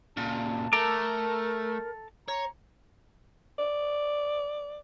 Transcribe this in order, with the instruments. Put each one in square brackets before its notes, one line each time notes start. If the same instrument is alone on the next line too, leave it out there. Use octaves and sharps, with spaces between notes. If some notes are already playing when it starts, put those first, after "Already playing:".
[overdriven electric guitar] A#2 C#3 [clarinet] A5
[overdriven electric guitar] A3 [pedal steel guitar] A4 A#5 D6 [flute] A#4
[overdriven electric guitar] C#5 [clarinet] A#5
[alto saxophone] D5